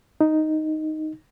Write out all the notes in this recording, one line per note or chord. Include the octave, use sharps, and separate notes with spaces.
D#4